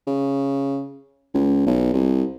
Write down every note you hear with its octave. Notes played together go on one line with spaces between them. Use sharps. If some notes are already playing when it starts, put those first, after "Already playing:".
C#3
C#2
B1
C2